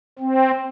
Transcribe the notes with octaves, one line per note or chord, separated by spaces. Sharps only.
C4